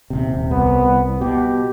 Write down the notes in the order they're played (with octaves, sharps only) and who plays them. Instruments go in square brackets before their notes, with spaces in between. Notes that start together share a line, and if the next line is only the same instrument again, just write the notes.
[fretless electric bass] D#1 C3
[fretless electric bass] C2 [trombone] B3
[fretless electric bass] B2 [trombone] G4